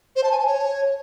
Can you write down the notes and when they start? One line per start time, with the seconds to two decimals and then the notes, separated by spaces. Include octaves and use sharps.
0.16 C5
0.23 A5
0.31 G#5
0.39 A5
0.46 C#5